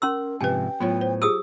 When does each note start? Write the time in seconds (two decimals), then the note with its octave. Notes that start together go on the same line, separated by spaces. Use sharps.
0.02 C#4 A#4 C6 E6
0.41 G#2 C3 F3 G4 B4 G5 G#5
0.80 A2 F#3 B3 F4 C#5
1.01 C5
1.22 F4 G4 G#4 D#6 E6